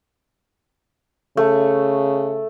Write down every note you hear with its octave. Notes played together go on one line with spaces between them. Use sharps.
C#3 A3